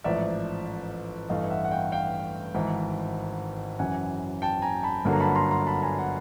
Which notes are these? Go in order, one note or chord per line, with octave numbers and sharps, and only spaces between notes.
A1 G#2 F3 D5 E5
A1 G2 E3 A3 D#5 F5
E5 F#5
F#5
F5 G5
F5 G5
G#1 G#2 E3
F#2 C#3 E3 F#5 G#5
G5 A5
G#5 A#5
A5 B5
G1 G2 D3 F#3 A#3
A#5
A5 B5
B5
A#5 C6
A#5 C6
A5 B5
G#5 A#5
F#5 G#5